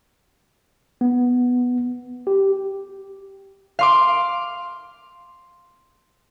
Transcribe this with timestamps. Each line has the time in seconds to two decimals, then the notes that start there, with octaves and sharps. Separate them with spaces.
1.01 B3
2.27 G4
3.79 F5 C6 D6